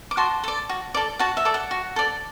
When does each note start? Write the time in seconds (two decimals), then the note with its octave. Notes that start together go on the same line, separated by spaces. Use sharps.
0.11 D6
0.17 F#4 A5 C6
0.44 A4 D5
0.69 F#4
0.94 A4 D5
1.19 F#4 F#5 A5
1.37 E5
1.45 A4 D5
1.54 F#5
1.71 F#4
1.96 A4 D5